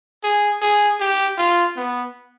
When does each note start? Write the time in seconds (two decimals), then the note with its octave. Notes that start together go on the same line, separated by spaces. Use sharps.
0.24 G#4
0.62 G#4
1.00 G4
1.38 F4
1.76 B3